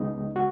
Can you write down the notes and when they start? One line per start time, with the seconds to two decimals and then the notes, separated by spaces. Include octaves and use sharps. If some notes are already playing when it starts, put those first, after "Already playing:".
Already playing: C#2 C#3 G#3 B3 D#4 D#5
0.36 F#4